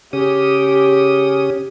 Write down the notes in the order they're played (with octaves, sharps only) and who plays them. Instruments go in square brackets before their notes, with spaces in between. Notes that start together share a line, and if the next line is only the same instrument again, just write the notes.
[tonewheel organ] C#3 C#4 D#6 [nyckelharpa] G4